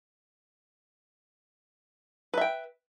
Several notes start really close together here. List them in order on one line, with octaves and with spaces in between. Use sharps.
B4 E5 G5